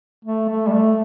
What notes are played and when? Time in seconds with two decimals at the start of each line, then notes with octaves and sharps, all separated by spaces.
0.25 A3
0.49 A3
0.67 G3
0.73 A3